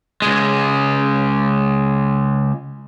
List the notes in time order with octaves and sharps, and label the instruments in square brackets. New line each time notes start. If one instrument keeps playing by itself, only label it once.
[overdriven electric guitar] C#2 G#3